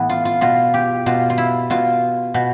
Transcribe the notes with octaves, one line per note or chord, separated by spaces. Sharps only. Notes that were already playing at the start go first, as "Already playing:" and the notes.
Already playing: A2 E3 B3
F4
F4
B2 F4
G4
B2 F4
F4
E4
B2 F4
B2